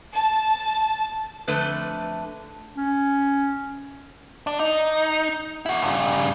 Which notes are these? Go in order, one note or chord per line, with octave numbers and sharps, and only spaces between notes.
A5
F2 D3 A3 B4 E5
C#4
D4
D#4
E4 F#4
G2 C#3